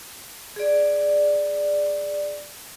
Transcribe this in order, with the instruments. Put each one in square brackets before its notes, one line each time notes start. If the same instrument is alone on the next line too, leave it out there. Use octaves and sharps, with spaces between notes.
[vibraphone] G#4 D5